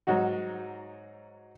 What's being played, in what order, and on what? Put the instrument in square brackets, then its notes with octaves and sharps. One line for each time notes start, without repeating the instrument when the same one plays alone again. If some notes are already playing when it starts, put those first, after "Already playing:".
[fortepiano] G#2 F#3 D#4 F#4